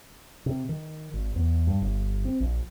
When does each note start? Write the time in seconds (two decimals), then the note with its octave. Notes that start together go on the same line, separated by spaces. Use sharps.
0.46 C3
0.69 D#3
1.14 G#1
1.36 E2
1.67 G2
1.81 G1
2.25 C4
2.40 A#1